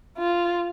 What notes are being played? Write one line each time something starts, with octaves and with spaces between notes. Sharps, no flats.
F4